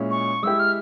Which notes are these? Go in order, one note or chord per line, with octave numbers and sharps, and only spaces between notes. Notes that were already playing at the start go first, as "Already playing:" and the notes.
Already playing: A#2 G#3 C#4 E4
C#6
G#3 E4 G4 E6
F6